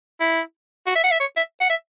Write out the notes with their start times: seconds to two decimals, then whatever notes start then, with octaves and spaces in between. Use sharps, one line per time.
0.20 E4
0.87 F#4
0.95 E5
1.04 F#5
1.11 E5
1.20 C#5
1.36 E5
1.61 F#5
1.70 E5